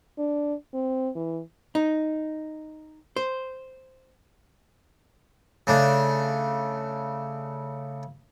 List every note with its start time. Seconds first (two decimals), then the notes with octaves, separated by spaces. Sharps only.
0.18 D4
0.74 C4
1.15 E3
1.75 D#4
3.16 C5
5.67 C#3 A3 D4